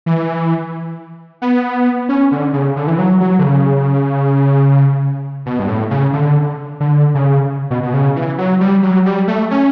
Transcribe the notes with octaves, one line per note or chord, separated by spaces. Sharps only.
E3
B3
C#4
D3
C#3
D3
E3
F#3
F#3
D3
C#3
B2
G2
A2
C#3
D3
D3
C#3
B2
B2
C#3
E3
F#3
G3
F#3
G3
A3
C#4